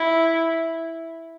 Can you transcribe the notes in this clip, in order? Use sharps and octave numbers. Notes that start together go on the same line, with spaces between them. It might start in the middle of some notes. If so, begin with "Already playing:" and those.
Already playing: E4